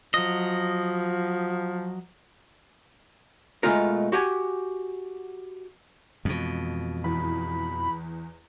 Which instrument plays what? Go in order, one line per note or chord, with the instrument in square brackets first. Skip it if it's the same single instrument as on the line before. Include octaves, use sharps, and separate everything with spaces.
[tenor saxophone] F3 [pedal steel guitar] F#3 D#5
[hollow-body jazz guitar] B2 G#3 A3 F4 A#4
F#4 G4 F#5 G#5
[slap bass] F2 B2 [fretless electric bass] E3 G#3 C4
[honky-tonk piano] E2 [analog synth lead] B5